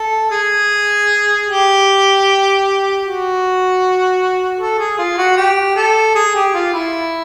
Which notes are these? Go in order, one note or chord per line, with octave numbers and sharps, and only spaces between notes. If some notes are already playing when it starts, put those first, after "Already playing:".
Already playing: A4
G#4
G4
F#4
A4
G#4
F4
F#4
G4
A4
G#4
G4
F4
E4